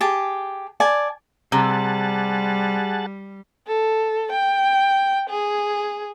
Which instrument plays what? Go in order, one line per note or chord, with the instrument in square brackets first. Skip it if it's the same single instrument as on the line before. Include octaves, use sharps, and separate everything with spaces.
[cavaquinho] G4 G#4 A5
D5 G#5 A5
[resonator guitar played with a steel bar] C3 [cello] G3 [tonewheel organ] G#4 F#5 A5
[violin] A4
G5
G#4